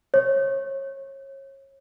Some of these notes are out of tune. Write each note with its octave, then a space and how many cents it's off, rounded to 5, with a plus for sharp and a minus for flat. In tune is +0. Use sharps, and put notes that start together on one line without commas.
C#5 -30